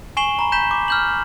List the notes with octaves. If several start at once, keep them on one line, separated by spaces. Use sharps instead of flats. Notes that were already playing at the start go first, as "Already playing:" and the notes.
G#5 C#6 C7 E7 F#7 G7
A#5 B5
A#5 B5 G6 B6 E7 G7
D6
F6 G6 F#7